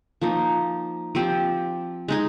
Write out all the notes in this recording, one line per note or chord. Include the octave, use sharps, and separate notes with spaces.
F3 A#3 D#4
F3 C4 G4
G#3 D#4 G#4